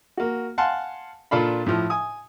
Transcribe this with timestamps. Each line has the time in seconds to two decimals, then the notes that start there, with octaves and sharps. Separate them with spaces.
0.17 A#3 F#4
0.58 F5 F#5 G#5 A5 C6
1.31 A#2 D4 F4 A4 F5 B5
1.66 A2 F3
1.90 G#5 D#6